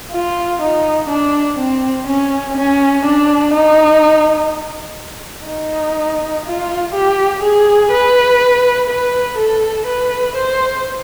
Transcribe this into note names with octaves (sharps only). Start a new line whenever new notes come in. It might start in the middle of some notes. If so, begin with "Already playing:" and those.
F4
D#4
D4
C4
C#4
C#4
D4
D#4
D#4
F4
G4
G#4
B4
B4
A4
B4
C5